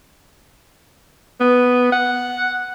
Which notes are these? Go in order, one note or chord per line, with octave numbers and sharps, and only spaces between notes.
B3
F#5